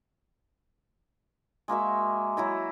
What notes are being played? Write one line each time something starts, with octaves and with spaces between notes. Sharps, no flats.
G#3 A#3 F#4 E5
F#3 E4 A#5